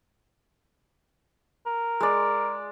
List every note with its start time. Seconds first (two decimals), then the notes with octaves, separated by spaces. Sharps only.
1.66 A#4
2.00 G#3 D5